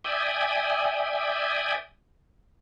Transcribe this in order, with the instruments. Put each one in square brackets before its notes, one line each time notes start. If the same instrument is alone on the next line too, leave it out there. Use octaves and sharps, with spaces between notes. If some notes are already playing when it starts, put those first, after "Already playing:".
[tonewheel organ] D5 E5 G5 G#5 D#6